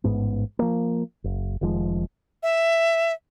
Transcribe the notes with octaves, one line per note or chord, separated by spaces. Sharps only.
A1 G#2 B3
F3 A#3
F#1
F1 D#3 F3 G#3
E5